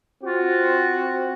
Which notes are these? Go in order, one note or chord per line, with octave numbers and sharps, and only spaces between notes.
C4 F4 F#4